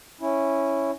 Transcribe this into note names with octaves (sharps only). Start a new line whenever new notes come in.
C#4 E4